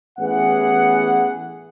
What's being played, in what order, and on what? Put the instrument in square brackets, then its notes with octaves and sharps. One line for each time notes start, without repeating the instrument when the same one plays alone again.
[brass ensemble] A1 E3 B3 G#4 F#5